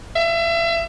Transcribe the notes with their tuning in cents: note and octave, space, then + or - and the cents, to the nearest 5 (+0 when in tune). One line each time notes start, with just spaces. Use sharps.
E5 +35